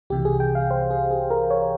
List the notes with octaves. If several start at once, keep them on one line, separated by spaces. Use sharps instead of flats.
C2 C3 E3 G4
G#4
G5
F5
C5
G#4
G#4
A#4
C#5